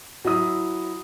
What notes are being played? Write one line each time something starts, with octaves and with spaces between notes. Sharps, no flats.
F#3 E4 D#6